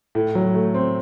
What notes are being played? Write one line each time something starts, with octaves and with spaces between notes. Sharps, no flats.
A2
F#3
A3
C4